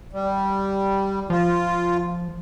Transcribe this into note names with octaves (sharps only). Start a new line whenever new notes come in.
G3
F3 F4